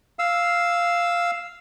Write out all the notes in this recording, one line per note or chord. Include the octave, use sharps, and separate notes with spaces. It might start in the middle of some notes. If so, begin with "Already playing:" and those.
F5 E6